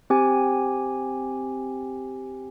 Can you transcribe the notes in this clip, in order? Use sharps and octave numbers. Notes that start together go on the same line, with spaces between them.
C4 G4 G#5